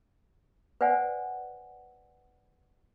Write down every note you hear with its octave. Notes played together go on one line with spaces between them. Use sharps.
B4 C5 D5 F#5 G#5